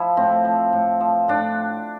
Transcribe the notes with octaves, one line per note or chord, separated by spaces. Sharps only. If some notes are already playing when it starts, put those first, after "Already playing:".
Already playing: F3 E4
A2 C4
F3
A2
F3
A2 D4